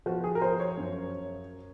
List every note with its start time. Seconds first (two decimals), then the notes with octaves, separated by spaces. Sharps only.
0.06 F3 F#4
0.24 G#4
0.35 A#4
0.42 F3 C5
0.60 C#5
0.77 F#2